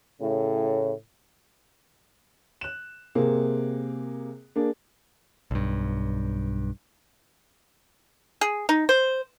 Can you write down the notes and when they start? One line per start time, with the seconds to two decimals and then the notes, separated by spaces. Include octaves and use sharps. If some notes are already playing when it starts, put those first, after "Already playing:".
0.21 A2 C#3
2.61 F#6 E7
3.15 C3 A#3 G#4
4.56 A#3 D4 G#4
5.51 B1 G2
8.41 G#4
8.69 D#4
8.89 C5